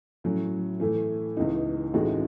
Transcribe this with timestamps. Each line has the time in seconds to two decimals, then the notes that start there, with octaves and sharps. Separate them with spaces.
0.24 A2 F#3 C#4
0.80 A2 E3 A3
1.37 C#2 C#3 E3 B3 D#4
1.94 A1 A2 G#3 D#4 F#4